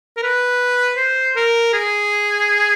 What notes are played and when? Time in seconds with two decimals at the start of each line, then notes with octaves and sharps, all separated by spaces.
0.17 A#4
0.23 B4
0.97 C5
1.36 A#4
1.73 G#4